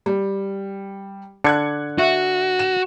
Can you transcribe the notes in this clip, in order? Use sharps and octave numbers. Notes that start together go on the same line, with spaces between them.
G3
D3 D4 F#6 G#6 C#7
F#4 E5
E7